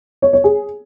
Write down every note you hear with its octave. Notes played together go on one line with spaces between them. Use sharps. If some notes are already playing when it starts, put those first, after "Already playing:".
C#5
C#5
G#4